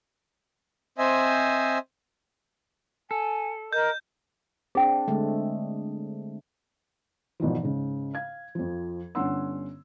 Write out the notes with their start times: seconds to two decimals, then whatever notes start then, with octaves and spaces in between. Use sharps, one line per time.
0.98 C4 C5 D#5 E5 G#5
3.11 A4 G#5
3.73 A#4 D#5 G6
4.75 C4 D4 G#4 G5
5.08 D3 G#3 A3
7.40 G#1 B2 E3 F3
7.62 G#2 C#3
8.14 F5 G#6
8.55 F2 F3
9.15 G1 C#4 D4 F#5 C6 E6